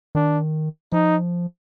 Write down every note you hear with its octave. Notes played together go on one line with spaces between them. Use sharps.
D#3 D4
F3 D#4